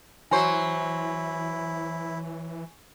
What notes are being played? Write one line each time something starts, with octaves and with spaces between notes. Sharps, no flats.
E3 F#3 E4 C5 G#5 C#6